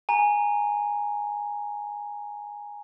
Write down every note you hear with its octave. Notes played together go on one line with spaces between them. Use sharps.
G#5 A#5